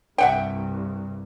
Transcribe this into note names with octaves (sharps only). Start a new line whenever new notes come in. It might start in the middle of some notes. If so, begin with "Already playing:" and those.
C2 G2 E5 F#5 G5